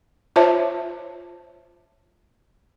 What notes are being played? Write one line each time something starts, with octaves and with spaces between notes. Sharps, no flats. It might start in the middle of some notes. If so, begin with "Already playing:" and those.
F4 C5 C#5 E5 A5